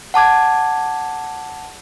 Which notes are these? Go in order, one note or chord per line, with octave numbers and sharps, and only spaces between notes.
F#5 A5 D6 G#6